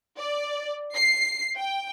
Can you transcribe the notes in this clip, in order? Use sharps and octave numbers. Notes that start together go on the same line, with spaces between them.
D5
C7
G5